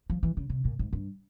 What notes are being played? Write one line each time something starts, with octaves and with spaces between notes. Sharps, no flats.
F3
E3
C#3
C3
A#2
G#2
G2